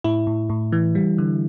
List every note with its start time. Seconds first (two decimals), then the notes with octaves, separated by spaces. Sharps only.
0.04 A2 E4
0.27 A2
0.50 A2
0.72 E3
0.95 G3
1.18 D3